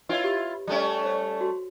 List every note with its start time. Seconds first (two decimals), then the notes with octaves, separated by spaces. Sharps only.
0.09 E4 F4 B4 C#5 D#5
0.24 G4
0.67 G3 A3 C#4
1.03 C5 C#5
1.41 F#4 C6